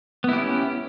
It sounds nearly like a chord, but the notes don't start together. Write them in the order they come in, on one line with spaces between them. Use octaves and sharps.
B3 E4 G4 C#4